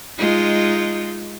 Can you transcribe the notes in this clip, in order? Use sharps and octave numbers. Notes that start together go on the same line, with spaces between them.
G#3 D#4 F4